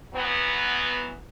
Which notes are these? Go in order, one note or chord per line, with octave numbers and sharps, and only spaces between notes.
E3 F#3 B3